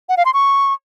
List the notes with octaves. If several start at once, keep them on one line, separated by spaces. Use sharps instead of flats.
F#5
F5
C6
C#6